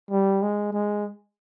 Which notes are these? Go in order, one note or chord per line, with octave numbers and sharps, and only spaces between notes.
G3
G#3
G#3